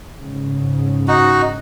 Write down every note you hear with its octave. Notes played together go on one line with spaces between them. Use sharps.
G#2 C#3
D#4 F#4